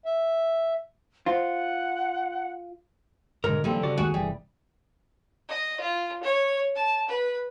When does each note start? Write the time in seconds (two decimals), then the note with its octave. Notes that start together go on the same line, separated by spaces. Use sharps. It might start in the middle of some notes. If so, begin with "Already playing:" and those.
0.05 E5
1.26 F4 C5 F#5
3.44 G#2 B2 D3 A#4
3.64 B1 E2 D3 G3 A#3 C4
3.83 C#3 F#4 D5
3.98 D#2 D#3 G#3 F#4 G#4
4.14 G1 C3 E3 G3
5.49 D#5
5.80 F4
6.22 C#5
6.75 A5
7.08 B4